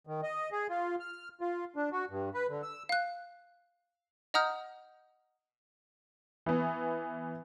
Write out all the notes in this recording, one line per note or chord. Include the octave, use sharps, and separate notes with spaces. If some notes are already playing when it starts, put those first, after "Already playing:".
D#3
D#5
G#4
F4
F6
F4
D4
F#4
G2
B4
D3
E6
F5 F#6
D#5 F#5 A#5 D#6 F6 G6
E3 B3